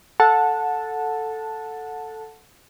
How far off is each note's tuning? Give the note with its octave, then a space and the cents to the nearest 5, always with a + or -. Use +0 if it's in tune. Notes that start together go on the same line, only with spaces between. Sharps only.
A4 +0 F#5 -20 A5 +0